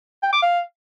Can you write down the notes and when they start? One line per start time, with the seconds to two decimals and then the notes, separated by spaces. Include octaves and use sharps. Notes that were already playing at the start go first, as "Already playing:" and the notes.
0.23 G5
0.33 D6
0.42 F5